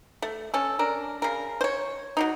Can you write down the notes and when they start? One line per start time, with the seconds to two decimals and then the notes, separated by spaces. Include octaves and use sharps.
0.22 A3
0.54 C#4 A4
0.79 D4 A#4
1.22 C#3 A#4
1.61 C5 C#5
2.17 F#3 A#3 D#4